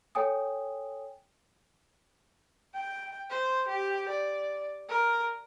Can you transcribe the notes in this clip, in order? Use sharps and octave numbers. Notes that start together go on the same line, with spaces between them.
A4 C#5 G5 G#5 D#6
G5
C5
G4
D5
A#4